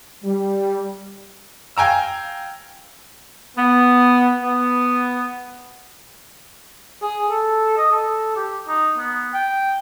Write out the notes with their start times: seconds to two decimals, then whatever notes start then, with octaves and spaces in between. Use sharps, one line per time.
0.24 G3
1.77 F5 G5 G#5 A#5 E6
3.56 B3
4.43 B3
7.02 G#4
7.30 A4
7.77 D#5
7.92 A4
8.36 G4
8.68 D#4
8.98 B3
9.34 G5